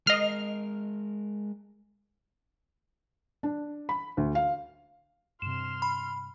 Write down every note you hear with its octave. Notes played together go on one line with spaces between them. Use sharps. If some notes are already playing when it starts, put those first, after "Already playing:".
G#3 A#4 D#5 F6 C7
D4
B5
D2
F5
G2 C3 C6 F6 E7
B5